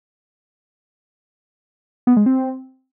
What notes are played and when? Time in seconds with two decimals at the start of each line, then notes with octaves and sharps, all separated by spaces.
2.07 B3
2.17 G#3
2.26 C4